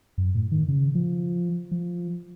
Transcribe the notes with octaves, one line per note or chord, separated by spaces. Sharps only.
F#2
A2
D#3
C#3
F3
F3